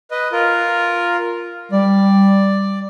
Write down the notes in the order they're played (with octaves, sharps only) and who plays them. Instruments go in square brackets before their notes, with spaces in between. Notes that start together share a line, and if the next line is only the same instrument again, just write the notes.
[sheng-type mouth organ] B4 D#5
F4 A#4
[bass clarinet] G3 [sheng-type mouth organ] D5